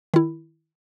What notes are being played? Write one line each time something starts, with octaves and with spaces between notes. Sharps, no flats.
D#3 E4